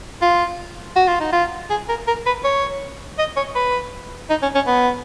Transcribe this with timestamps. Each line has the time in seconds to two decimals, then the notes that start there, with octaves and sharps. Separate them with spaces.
0.22 F4
0.96 F#4
1.08 F4
1.20 D#4
1.32 F4
1.70 G#4
1.89 A#4
2.07 A#4
2.26 B4
2.44 C#5
3.18 D#5
3.37 C#5
3.55 B4
4.30 D#4
4.42 C#4
4.55 C#4
4.67 B3